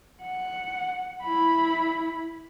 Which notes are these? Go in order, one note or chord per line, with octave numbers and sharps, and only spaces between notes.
F#5
E4 B5